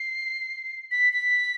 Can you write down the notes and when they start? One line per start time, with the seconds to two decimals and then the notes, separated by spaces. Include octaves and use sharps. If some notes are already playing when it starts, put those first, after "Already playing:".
Already playing: C7
0.91 B6
1.13 B6